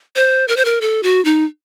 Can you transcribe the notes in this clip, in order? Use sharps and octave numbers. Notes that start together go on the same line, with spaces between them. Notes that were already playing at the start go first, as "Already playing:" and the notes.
C5
A#4
C5
A#4
A4
F#4
D#4